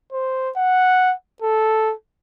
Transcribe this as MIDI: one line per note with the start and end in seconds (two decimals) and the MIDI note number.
0.13 0.50 72
0.57 1.13 78
1.42 1.93 69